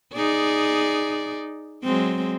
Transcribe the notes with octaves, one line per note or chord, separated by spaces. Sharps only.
D#4 G#4 D5
F#3 G#3 C4